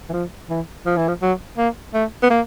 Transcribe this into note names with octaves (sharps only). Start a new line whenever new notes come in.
E3
F3
E3
F3
E3
F3
F#3
A#3
A3
B3
A#3